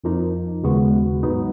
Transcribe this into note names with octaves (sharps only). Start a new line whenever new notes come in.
F2 F3 A#3 D#4
D#2 C#3 G#3 B3 F#4
G#2 F#3 B3 D#4